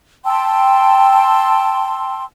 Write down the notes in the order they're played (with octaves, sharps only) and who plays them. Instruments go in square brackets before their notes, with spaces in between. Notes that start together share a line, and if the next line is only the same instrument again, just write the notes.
[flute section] G5 A5 C6 E6